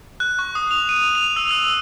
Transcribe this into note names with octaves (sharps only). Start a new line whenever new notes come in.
F#6
C#6
D#6
F7
D#7
F7
E6
E6